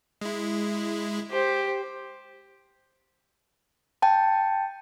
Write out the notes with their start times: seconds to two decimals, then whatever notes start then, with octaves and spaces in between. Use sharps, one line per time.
0.21 G#3 E4
1.31 G4 C5
4.02 G5 A5